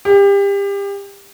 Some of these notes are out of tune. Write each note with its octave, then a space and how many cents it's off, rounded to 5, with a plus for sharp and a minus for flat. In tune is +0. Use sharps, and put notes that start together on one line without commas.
G4 +30